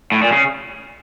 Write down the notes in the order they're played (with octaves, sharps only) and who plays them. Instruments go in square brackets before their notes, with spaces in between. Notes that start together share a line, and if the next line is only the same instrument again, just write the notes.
[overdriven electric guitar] A2
A#2
C#3